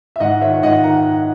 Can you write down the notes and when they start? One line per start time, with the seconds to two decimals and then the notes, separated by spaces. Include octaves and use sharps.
0.16 E5
0.20 G#2 D#5 F#5
0.41 D#3 C#5 E5
0.63 G#2 D#5 F#5
0.84 D#3 F#5 A#5